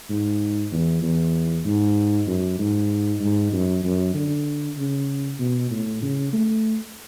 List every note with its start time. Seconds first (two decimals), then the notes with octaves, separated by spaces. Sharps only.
0.10 G#2
0.72 E2
1.02 E2
1.65 G#2
2.27 F#2
2.59 G#2
3.20 G#2
3.53 F#2
3.84 F#2
4.15 D3
4.78 C#3
5.39 B2
5.71 A2
6.03 C#3
6.33 A3